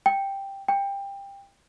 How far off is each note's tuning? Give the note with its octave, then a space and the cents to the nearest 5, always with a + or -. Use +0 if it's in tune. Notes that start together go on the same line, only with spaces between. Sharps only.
G5 +5
G5 +20